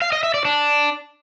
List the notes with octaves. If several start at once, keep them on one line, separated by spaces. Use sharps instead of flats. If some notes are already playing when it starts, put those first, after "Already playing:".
F5
D#5
E5
D5
D4